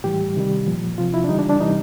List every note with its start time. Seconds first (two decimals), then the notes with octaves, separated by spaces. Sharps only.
0.04 A2 E3 G3 G4
0.36 C3 D#3 G3
0.67 A#2 F3
0.98 C3 F3 F4
1.14 E4
1.24 D4
1.29 C#3 E3 G3 D#4
1.39 D4
1.49 D4
1.61 C3 E3 G3 D#4